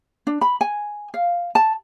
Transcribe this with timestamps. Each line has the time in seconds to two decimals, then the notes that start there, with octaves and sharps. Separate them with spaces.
0.27 D4
0.41 B5
0.61 G#5
1.14 F5
1.55 A5